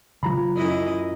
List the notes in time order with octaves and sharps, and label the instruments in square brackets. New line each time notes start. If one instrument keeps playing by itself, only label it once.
[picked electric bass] C#3 F#3 [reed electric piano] F4 A#5 B5
[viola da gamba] F#2 E4 D#5